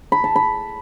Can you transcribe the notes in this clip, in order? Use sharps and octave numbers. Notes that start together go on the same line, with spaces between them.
B5
A5
B5